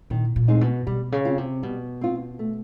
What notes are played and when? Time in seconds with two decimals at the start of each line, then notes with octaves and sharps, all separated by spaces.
0.10 A#2 D#3
0.36 A#2
0.48 G#3 C4 D#4
0.61 B2
0.87 B2 G3
1.12 C#3
1.25 C4 F4
1.38 C3
1.63 B2 G3
2.01 C4 F4
2.39 A3